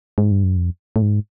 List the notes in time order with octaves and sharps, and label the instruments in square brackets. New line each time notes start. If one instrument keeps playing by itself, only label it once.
[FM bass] G#2
G2
F#2
F2
A2
G#2